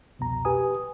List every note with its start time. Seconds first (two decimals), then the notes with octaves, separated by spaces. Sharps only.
0.19 C2 F2 B2 A#5
0.45 G4 B4 G#5 D#6